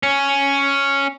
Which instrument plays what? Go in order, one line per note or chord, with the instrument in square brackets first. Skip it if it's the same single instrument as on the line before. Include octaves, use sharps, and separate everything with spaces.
[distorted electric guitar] C#4